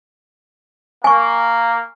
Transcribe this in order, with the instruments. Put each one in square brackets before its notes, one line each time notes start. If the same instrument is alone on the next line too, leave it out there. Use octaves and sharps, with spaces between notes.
[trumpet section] A#3 [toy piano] G#5 C#6